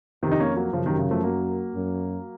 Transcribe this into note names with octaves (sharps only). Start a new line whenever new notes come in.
F2 C3 D#3
D#4
A#3 C#4
F#3 A#3
F#2 C#3 F3
C3 D#3
C#3
F3 A3
F#3 A#3
F#2